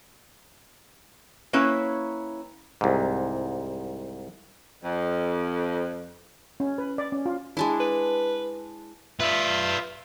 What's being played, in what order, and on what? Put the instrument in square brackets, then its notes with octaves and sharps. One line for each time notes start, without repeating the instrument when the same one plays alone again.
[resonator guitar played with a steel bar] A#3 C#4 E4 B4 C#5
[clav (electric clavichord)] C2 G#2
[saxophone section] F2
[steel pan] C#4
B4
D5
C#4
F4
[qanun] G#3 D4 E4
[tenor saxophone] B4
[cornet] F4 [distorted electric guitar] B4 D5 [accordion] E5